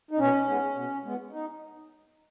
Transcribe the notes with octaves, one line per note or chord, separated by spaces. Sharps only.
D#4
B2 C#4
G#3 B3
B2
G#3 B3
D#4